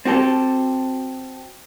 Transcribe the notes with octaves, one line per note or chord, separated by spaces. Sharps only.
C4 F#4 G4 A4